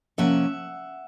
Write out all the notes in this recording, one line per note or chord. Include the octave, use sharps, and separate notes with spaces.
C3 F3 A#3 C#4 E5 F#5